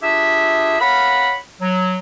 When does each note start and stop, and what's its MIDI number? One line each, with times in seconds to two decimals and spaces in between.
0.02 0.78 62
0.02 0.78 65
0.02 0.78 67
0.02 0.78 68
0.02 0.78 76
0.80 1.35 70
0.80 1.35 73
0.80 1.35 77
0.80 1.35 78
0.80 1.35 83
1.61 1.97 54